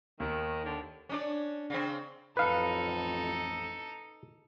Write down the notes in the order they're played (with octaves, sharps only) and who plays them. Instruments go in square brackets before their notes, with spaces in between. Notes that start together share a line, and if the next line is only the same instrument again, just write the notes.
[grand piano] D#2 [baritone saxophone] D#3
[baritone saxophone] D3
[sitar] C#4 D4 D5
C#3 C4
[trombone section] A1 F2 [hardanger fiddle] D#4 A4 [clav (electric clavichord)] B4 F5